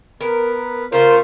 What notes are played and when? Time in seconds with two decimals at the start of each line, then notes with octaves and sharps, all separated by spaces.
0.21 B3 A#4 B4
0.92 C#3 A3 F4 A#4 C5 F6